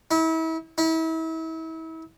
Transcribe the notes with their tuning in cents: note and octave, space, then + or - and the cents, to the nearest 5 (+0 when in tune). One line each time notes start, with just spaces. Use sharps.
E4 -35
E4 -35